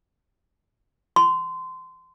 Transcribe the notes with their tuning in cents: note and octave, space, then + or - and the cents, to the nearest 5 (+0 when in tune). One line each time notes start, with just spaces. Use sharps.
C6 -25